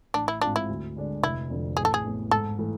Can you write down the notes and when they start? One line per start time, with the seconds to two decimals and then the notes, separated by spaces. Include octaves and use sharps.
0.14 A1 D4
0.28 E4
0.41 G#2 G#3 C4 D4 F4
0.56 E4
0.69 D2
0.96 D3 G#3 D4
1.23 F1 E4
1.50 F2 D3
1.77 A1 G#4
1.85 A4
1.94 G#4
2.04 A2 E3 B3
2.31 G#2 A4
2.58 E3 A3 E4